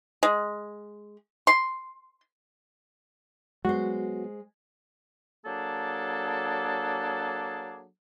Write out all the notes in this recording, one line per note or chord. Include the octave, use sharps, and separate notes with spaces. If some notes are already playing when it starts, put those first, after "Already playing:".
G#3
C6
F#3 G#3 B3 F#4 C5
F#3 A#3 D4 G#4 A4